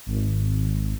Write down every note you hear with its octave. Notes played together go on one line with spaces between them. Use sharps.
G#1